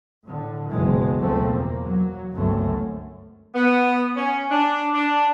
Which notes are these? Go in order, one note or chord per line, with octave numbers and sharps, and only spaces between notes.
A2 D3
F#1 B1 B2 E3 F#3 G#3
D2 B2 F3 A3 C4
E2 A#3
F#3
G1 C#2 F#2 F#3 A3 C4
B3
C#4
D4
D4